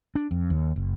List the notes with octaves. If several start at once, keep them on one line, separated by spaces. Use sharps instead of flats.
D4
F2
D#2
F#1